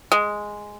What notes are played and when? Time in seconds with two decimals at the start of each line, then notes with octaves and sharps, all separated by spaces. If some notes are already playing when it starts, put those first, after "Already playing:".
0.12 G#3